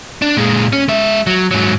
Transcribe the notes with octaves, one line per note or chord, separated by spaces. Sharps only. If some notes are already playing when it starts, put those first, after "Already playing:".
D4
A#2 G#3
C#4
G#3 E5
F#3
G#2 F#3